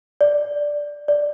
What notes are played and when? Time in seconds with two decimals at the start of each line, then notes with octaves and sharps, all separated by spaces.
0.21 D5
1.08 D5